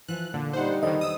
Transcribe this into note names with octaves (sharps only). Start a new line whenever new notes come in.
E3 F3 F#6
A#2 D3
G3 D#4 C5 F#5
E2 D3 D#3 C5 D#5
D#6 E6